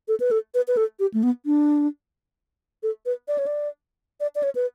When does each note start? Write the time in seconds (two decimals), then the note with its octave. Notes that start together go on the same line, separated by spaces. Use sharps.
0.08 A4
0.20 B4
0.31 A4
0.54 B4
0.68 B4
0.77 A4
1.00 G4
1.14 A3
1.23 B3
1.46 D4
2.83 A4
3.06 B4
3.28 D5
3.38 C#5
3.46 D5
4.20 D5
4.35 D5
4.43 C#5
4.55 B4